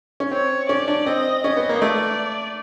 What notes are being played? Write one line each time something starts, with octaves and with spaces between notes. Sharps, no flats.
C#4
C4 C#5
C#4 D5
D4
C4 D#5
C#4 D#5
B3
A#3
A3 D5